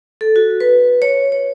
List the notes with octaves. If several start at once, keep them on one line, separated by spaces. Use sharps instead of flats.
A4
F#4
B4
C#5
C#5